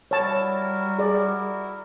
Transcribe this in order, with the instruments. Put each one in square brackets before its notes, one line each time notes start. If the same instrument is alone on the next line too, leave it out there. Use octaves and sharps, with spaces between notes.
[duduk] G3 [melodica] E4 F#4 A#4 [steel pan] C#5 A5
[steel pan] G#4 D5